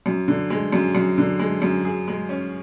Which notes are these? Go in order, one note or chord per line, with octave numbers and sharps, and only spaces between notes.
F#2
D3
G#3
F#2
F#2
D3
G#3
F#2
G#4
G#3
C#4